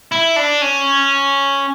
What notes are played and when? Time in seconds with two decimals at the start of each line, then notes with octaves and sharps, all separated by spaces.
0.12 E4
0.36 D4
0.62 C#4